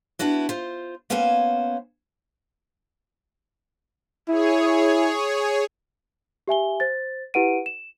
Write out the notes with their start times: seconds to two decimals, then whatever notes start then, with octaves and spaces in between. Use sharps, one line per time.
0.19 B3 D4 E4 F#4 B4
0.49 F4 C5
1.10 A#3 B3 C#4 C5 F5 G#5
4.28 E4 G#4 C#5
6.48 G4 E5 G#5 G7
6.80 C5 A6
7.34 E4 G4 B4 F#5 D7 D#7
7.66 E7